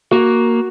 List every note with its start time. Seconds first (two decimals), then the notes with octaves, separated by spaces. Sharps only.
0.11 A#3 F#4